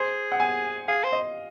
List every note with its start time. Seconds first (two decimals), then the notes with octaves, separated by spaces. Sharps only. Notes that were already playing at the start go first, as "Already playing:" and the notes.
Already playing: G#4 C5
0.32 F#5
0.40 G#5
0.88 G#4 F5
1.04 C5
1.12 D#5